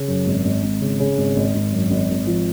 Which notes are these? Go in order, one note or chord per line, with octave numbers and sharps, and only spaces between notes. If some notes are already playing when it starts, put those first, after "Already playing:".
Already playing: C#3
F#2
G#1
G#1
G#1
C#3
C#3
G#1
G#1
G#1
F#2
G#1
G#1
F3